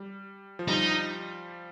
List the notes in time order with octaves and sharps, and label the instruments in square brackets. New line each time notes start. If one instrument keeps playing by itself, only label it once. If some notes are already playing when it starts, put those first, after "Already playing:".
Already playing: [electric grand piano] G3
F3
[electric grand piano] G3 [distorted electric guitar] D#4